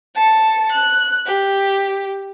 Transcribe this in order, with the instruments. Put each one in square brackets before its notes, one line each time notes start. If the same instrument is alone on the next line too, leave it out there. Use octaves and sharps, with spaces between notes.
[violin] A5 C#7
F#6
G4